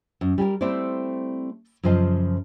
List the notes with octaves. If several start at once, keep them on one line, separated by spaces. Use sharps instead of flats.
F#2
G3 G4 G#4 A#4
G3 A3 C4 E4 C5 D5
F#2 C#3 F3 C5 D#5 A5